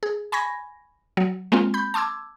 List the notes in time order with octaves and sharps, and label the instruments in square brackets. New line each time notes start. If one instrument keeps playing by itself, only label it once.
[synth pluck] G#4
G#5 B5 C#6 G#6 A#6
F#3
G#3 A#3 C4 F4
B5 G6
A5 C6 D6 E6 G#6